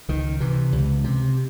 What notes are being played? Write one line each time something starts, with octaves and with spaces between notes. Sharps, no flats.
C#2 D#3
C3 E3
C#2
C3